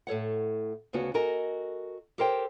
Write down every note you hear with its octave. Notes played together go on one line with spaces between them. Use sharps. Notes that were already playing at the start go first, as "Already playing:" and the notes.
A2 A4 C#5 F#5
D2 C#3 B3 C#4 F#4
F#4 A4 A#4 D#5 G#5
G4 A4 A#4 C5 C#5 G5